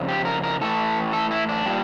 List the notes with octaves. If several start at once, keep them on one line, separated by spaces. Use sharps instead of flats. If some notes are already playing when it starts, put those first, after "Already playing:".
Already playing: F2 C#3
G4
A#4
A#4
A2 E3 A3 A4
A4
E4
D4
A#2 G3